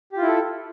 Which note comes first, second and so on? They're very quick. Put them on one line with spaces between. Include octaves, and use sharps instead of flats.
G4 F4 E4 A4